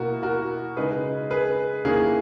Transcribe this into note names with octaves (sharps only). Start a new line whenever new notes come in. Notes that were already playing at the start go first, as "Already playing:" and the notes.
Already playing: B2 A#3 E4 F#4 A#4
F#4 A#4
C#3 G#3 D#4 G#4 B4
G#4 B4
D#3 A#3 C#4 E4 G#4